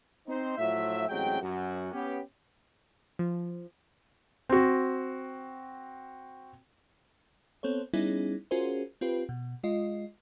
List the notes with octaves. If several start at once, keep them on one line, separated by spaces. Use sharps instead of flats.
C4 D#4 C5
A2 F3 F#3 F4 E5
A1 E2 F#3 G#3 C4 G5
F#2 F#4
B3 C#4 G4
F3
C4 F#4
B3 C4 A4 C5 C#5
G3 B3 C#4 D#4 E4 G#4
C#4 F4 F#4 G#4 A#4 C5
C4 F4 G4 B4
B2
G#3 F4 D#5